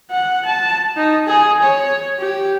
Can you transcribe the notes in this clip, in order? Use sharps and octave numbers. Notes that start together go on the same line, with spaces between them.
F#5
A5
D#4
G#4
C#5
G4